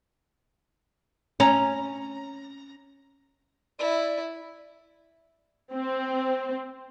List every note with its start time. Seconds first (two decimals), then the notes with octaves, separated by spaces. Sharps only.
1.40 C#4 A#5
3.79 E4 D5
5.73 C4